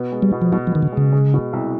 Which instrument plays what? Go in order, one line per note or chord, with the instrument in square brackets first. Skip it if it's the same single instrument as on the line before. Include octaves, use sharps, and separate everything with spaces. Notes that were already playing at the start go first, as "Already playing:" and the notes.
Already playing: [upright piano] B2 B3
G#3
[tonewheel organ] G3
[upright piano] B2
[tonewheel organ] F3
[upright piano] B2 [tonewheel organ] F#3
[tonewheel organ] F3
[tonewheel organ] D#3 [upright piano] B3
[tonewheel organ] D3
[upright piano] G#3
[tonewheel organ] C#3
[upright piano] G#3
B2
C2